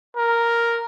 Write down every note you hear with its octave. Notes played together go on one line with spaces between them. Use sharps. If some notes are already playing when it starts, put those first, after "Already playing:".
A#4